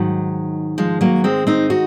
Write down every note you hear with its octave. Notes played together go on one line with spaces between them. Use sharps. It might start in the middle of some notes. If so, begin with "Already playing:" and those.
Already playing: G#2 D#3 F#3
F3 G#3
F#3 A#3
G#3 C4
C4 D#4
D#4 F#4